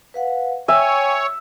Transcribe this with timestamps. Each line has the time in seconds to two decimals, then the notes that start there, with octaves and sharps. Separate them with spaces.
0.14 B4 F5 F#5
0.68 C#5 E5 G5 G#5 E6